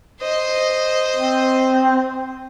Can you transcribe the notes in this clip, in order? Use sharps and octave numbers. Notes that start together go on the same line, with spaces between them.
C5 D#5
C4